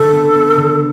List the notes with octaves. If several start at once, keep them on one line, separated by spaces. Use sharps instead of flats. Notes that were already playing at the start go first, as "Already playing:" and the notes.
Already playing: D3 A4
B3
B3
D3